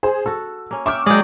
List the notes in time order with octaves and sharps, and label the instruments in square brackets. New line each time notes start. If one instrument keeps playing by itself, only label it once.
[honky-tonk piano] G#4 C5
[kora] F#4 A4 [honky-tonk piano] E6
[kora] A#3 C#4
[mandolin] E5 G5 [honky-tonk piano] C#6 D6 F6
[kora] F#3 G#4 D#5 [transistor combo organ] G#3 [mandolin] D5 G5